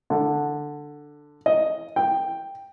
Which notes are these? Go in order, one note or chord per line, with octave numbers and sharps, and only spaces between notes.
D3
D#5
G5